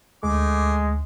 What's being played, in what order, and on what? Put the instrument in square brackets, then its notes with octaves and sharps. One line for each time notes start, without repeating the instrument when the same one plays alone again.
[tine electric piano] D2 [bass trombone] G#3 [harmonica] A3 D6